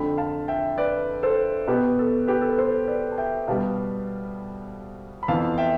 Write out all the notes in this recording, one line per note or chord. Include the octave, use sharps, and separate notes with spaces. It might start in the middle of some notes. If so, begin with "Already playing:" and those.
Already playing: F2 D3 A3 G5 B5
F5 A5
E5 G5
B4 D5
A4 C5
B2 B3 G4 B4
A4
G4 B4
A4
B4
A4 C5
B4 D5
A5
E5 G5
B2 G3 B3 F5 A5
B5
F2 E3 B3 F5 A5
E5 G5